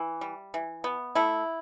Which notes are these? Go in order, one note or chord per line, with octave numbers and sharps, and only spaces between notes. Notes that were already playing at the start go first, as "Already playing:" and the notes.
Already playing: E3
G3
E3
B3
A3 E4